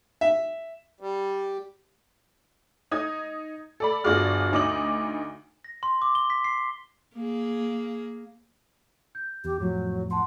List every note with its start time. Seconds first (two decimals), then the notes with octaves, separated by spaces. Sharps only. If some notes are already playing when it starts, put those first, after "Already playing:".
0.21 E5
1.00 G3
2.92 D#4 D#6 G#6
3.80 A4 D5 B5
4.04 G1 F4 F#4 G#4 D5 F6
4.52 D2 D#4 D6 D#6 F#7
5.64 A#6
5.83 C6
6.02 D6
6.15 G7
6.30 B6
6.44 C7
7.15 A#3 G#4
9.15 G6
9.45 E2 G4
9.60 F2 A2 F3 F#3
10.11 F#5 A5 C6